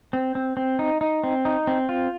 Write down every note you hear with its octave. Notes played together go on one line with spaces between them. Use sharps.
C4
C4
C4
D#4
D#4
C4
D#4
C4
F4